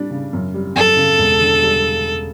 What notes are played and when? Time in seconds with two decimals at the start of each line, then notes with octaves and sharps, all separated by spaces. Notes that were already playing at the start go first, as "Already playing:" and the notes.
Already playing: G3 D4
0.11 C#3
0.33 F#2
0.54 G3
0.76 F#2 A4
0.97 C#3
1.18 E1
1.40 D3
1.62 G3